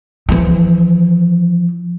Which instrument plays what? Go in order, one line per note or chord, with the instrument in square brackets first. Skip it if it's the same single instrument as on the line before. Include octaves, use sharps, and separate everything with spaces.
[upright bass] E3 F3